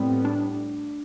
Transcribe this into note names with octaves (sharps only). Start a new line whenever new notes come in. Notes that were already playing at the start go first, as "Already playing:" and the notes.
Already playing: A2 G3 B3 C4
D4